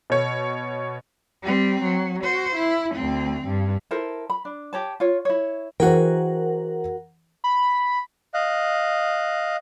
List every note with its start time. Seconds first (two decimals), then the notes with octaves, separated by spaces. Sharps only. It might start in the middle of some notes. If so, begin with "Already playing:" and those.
0.10 B2 C#5
1.42 G3 C4
1.82 F#3
2.23 F#4 C5
2.55 E4
2.95 D2 C4
3.46 G2
3.91 E4 A4 A#4 C5
4.30 B5
4.45 D4
4.73 G4 C#5 A5
5.00 F4 C#5
5.25 E4 C#5
5.80 E3 F#4 G#4 A#4 C5 F#5 G5
7.44 B5
8.34 D#5 F5 F#6